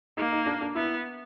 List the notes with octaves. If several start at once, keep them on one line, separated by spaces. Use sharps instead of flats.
A#3 D#4
D#4
D4
D4
B3 E4